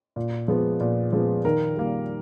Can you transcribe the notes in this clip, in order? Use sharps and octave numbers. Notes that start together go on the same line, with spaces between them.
A#2
F3 G#3 B3
A#2
F3 G#3 B3
D#3 A#4
G3 A#3